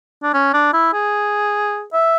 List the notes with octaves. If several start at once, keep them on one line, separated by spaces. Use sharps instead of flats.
D4
C#4
D4
E4
G#4
E5